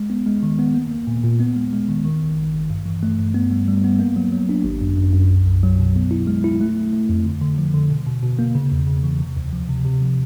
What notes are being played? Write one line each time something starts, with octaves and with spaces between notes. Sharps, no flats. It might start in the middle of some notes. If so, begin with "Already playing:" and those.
Already playing: G#3
B3
G#3
D#3
B3
A#3
A#3
A#2
A#2
B3
G#3
G#3
D#3
D#3
G#1
G#1
G#1
G2
E3
A3
G2
B3
G3
G3
B3
A#3
F#3
F#3
D4
G#1
F#2
F#2
F#2
B1
B1
F#3
B2
B3
E4
G#3
E4
A3
A3
A3
F2
D3
D3
F3
D3
B2
B2
B2
A#3
C#3
E2
C#3
E3
C3
D2
F3
C3
C3
F3